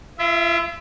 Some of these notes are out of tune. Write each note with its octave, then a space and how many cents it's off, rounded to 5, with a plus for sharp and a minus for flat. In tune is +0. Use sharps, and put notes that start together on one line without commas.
F4 -40 E5 +0